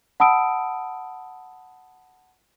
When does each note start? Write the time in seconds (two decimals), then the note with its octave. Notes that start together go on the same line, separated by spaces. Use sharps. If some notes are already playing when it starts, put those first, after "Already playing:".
0.20 F#5 A5 B5 D#6 E6 D7